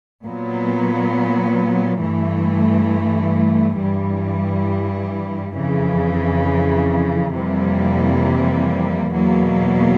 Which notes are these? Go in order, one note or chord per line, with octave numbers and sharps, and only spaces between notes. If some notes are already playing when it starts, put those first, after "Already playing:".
A#2 F#3 B3
G2 E3 A3
G2 E3 G3
F2 C#3 E3
F2 C3 E3 G3 A#3
E2 B2 F#3 A#3